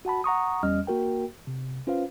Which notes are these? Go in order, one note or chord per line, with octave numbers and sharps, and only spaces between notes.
F#4 F#5 A5 B5
F#5 A#5 C#6 D#6
E2 G3 C#4 D#5 F6
A#3 F#4 A#4 G5
C3
C#4 F4 B4 C5 F5